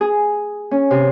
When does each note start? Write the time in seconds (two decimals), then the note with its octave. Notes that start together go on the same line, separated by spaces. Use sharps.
0.01 G#4
0.71 C#4
0.91 C3